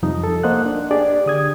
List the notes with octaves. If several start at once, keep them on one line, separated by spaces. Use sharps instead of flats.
F2 C3 F3 G3 D#4 D#5
A4
A#3 C5 D#5 F#5 F#6
D4
D4 G4 G#4 D5
D3 D#6 G#6